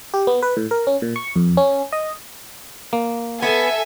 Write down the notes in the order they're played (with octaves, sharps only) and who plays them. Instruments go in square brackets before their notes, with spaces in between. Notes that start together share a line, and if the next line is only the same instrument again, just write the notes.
[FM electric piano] G4
B3
B4
A2
A#4
C#4
A#2
C#6
F2
C#4
D#5
[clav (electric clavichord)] A#3
[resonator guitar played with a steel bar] B3 [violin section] A4 E5 G#5